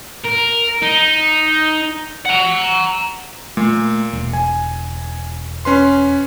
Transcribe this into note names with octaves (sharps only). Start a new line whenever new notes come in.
A#4
D#4
F#5 A#5
A#2 A3
E1
G#5
C#4 B4 C6